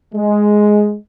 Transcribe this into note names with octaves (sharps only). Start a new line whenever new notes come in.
G#3